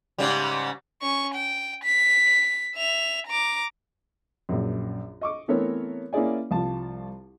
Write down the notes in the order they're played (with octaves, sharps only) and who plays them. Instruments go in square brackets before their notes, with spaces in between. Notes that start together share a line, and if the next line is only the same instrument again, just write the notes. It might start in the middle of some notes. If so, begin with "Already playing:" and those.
[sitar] G#2 C#3 G3
[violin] C#4 C#6
G5
B6
E5 F7
A#5 D6
[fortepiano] A#1 F#2
D#5 C#6 D6
E3 A3 B3 C4 A#4 C#5
A#3 C#4 E4 G#4 D5 G#5
C2 F3 A5